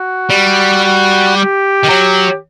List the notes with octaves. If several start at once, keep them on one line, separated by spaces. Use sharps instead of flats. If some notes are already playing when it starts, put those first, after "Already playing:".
Already playing: F#4
G3
F#4
G4
D#3
F#3